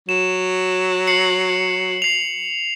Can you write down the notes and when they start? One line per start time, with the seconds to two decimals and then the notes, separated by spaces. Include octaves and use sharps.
0.09 F#3 E7
1.07 C7 C#7 F#7
2.02 C7 F7